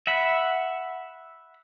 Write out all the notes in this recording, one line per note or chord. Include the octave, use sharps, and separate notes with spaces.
E5 F#5 B5